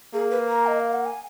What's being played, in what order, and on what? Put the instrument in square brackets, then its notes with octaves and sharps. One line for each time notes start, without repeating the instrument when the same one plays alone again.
[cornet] A#3 [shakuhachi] G#4
[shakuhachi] B4
A#5
D#5
F5
F#5
G#5